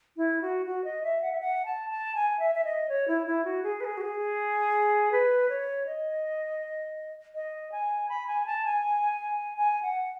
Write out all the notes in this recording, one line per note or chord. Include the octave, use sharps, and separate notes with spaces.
E4
F#4
F#4
D#5
E5
F#5
E5
F#5
A5
A5
G#5
E5
E5
D#5
C#5
E4
E4
F#4
G#4
B4
G#4
F#4
G#4
B4
C#5
D#5
D#5
G#5
B5
G#5
A5
G#5
G#5
F#5